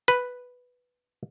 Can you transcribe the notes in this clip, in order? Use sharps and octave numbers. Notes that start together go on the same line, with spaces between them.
B4